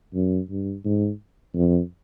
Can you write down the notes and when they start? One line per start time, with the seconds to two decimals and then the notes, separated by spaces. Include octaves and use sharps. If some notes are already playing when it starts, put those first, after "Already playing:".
0.14 F#2
0.50 G2
0.85 G#2
1.55 F2